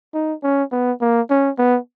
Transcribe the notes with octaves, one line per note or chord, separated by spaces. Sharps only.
D#4
C#4
B3
A#3
C#4
B3